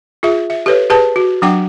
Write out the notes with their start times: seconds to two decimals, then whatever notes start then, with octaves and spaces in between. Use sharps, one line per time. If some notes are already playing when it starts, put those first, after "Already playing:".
0.23 F4 G#4 E5
0.50 E5
0.66 G4 A4 B4 C#5
0.90 G4 G#4 B4 A5
1.16 F#4
1.42 F#3 D4 F#5 G5 D6